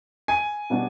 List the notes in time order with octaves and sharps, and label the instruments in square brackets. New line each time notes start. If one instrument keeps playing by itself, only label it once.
[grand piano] G#5
[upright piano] B2 G3 B3 D4